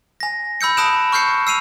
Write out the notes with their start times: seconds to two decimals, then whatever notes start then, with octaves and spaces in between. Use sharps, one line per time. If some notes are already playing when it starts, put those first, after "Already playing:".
0.20 G#5 A#6
0.61 B5 E6 G6 C#7
0.77 A5 B5 D#6 F#6 D7 E7
1.12 C#6 F6 G6 C7 C#7
1.47 E6 C7 D#7 F7